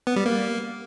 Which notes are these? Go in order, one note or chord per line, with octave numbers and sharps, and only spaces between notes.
B3
G3
A#3